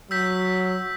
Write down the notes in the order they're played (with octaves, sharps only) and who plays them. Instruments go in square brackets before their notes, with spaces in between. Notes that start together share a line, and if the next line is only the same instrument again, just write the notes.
[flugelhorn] F#3 [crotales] E6 G6 B6